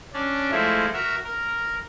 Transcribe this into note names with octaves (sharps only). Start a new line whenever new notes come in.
C#4 D4 D5
F3 G#3 A3 E4
F#4 A#4 E5
A#4